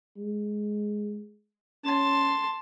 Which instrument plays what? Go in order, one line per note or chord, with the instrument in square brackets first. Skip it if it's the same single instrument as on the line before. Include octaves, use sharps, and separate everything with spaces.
[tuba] G#3
[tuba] C#4 [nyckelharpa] A5 C6